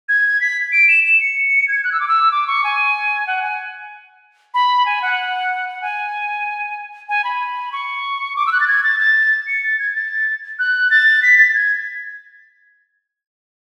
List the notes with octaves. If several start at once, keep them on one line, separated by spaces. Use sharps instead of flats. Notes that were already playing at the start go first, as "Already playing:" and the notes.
G#6
B6
D7
E7
E7
C#7
G#6
F#6
E6
D6
E6
D6
C#6
G#5
F#5
G#5
B5
G#5
F#5
F#5
G#5
G#5
B5
C#6
D6
E6
F#6
A6
G#6
A6
A6
C#7
A6
G#6
A6
F#6
A6
B6
A6
G#6